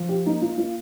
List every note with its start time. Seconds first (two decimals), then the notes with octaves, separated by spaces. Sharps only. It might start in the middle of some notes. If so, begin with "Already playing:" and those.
Already playing: F3
0.09 G4
0.25 A#3 D#4
0.42 F4
0.58 A#3 F4